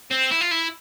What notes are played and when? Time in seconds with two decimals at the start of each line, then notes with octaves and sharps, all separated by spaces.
0.11 C4
0.31 E4
0.41 F4
0.51 E4